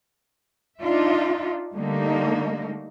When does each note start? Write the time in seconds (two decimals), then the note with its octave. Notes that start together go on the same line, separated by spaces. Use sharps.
0.79 D4 D#4 F4 E5
1.73 D3 G3 A3 A#3 D#4